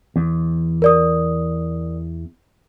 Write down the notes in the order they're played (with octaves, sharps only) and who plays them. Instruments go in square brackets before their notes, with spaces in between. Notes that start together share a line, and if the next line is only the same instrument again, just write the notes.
[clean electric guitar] E2
[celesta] A#4 D5 D#6